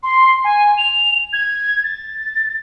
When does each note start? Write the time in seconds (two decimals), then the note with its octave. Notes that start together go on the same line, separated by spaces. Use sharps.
0.03 C6
0.44 G#5
0.78 F7
1.33 G#6
1.83 A6